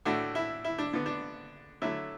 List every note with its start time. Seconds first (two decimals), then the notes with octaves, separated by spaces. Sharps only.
0.05 A2 A3 D4 F#4
0.35 E4
0.64 E4
0.78 D4
0.93 D3 B3
1.06 D4
1.82 D3 F#3 A3 E4